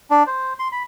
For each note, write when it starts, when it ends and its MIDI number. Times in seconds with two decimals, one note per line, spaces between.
0.10 0.23 62
0.27 0.53 72
0.59 0.68 84
0.72 0.83 83